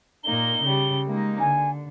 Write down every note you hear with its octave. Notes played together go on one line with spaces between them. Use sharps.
A#2 A#3 D#4 G7
C#3 G3
G#3 A#3 D#4
D3 G#5